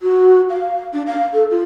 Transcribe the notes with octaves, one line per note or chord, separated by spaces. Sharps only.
F#4
F5
D4
F5
A4
F4